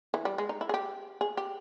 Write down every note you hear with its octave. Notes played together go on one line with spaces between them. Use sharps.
E3
G3
G#3
D#4
E4
G#4
G4
G#4
G4